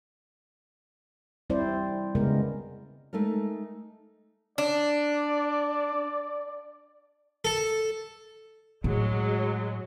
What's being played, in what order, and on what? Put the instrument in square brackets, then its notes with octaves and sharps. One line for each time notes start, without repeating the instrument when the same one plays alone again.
[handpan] G3 C4 E4 C5 D5
C#3 G#3 B3 A#4
[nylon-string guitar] G#3 A3 D#4 A4 A#4
[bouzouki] D4 [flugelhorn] D5
[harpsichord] A4
[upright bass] A2 [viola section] F#3 G#3